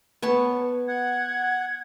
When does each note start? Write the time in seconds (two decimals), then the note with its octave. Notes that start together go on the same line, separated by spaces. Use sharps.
0.22 B3 C#5 A5
0.88 F#5 G#6